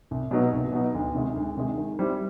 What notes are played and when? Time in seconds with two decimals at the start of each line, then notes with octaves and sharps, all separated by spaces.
0.11 C2
0.31 B2 F#3 B3 D#4
0.53 C2
0.73 B2 F#3 B3 D#4
0.95 D2
1.15 C3 D#3 G#3
1.36 D2
1.57 C3 D#3 G#3
1.77 D#3
1.99 G3 C4 E4 G4